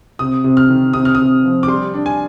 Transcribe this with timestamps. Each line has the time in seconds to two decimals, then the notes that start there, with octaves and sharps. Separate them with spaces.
0.19 C3 D#6
0.44 C3
0.57 F6
0.70 D#3
0.93 C3 D#6
1.05 F6
1.15 C3 D#6
1.44 F3
1.63 D6
1.68 G3 C6
1.94 D4
2.06 G#5